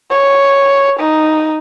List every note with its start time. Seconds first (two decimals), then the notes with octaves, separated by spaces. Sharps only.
0.11 C#5
1.00 D#4